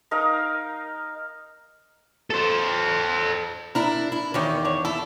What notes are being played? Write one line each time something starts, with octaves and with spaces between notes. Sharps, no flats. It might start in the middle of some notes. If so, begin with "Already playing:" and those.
D#4 A#4 D#5 F5
A4 C5
D4 E4 A#4
E4
E2 D#3 C4 C#4 G4
D4 C#5
E4 A4